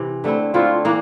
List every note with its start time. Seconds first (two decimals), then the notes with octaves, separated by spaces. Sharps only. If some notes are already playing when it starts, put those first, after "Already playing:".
Already playing: C3 E3
0.24 D3 A3 C4 E4
0.54 D3 A3 C4 E4 F4
0.85 E3 A#3 D4